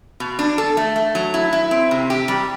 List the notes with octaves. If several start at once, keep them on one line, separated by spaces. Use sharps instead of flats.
B2
D4
A4
A3
A3
F#3
E4
E4
C4
C3
G4
G3